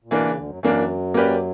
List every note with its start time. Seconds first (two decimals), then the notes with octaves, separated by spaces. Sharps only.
0.04 A#2
0.11 B2 E3 A#3 D4
0.25 C#3
0.37 D2 D3
0.49 F#2 F#3
0.63 F#2 E3 F#3 A#3 D4
1.14 A#3 C#4 G4 B4 D5